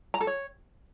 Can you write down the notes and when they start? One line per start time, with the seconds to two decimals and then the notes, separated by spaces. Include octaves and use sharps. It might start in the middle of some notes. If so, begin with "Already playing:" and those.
0.14 A#5
0.21 A4
0.27 C#5